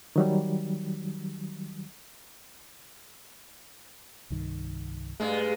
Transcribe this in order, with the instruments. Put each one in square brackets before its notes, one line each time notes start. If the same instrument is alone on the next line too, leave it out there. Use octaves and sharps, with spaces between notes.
[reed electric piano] D#3 F#3 G3
[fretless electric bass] C2 G2 D#3
[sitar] G2 G#3 [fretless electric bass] A3